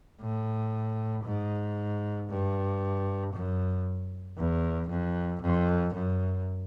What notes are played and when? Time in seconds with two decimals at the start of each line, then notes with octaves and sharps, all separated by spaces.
0.21 A2
1.26 G#2
2.30 G2
3.33 F#2
4.38 E2
4.90 F2
5.43 F2
5.94 F#2